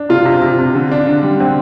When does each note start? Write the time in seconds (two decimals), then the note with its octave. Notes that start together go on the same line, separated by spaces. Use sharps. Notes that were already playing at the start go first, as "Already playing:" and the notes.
Already playing: D4
0.09 C3 F4
0.25 C3
0.42 C3
0.59 C3
0.75 D3
0.91 D4
1.07 D3
1.23 G3
1.40 D3 C4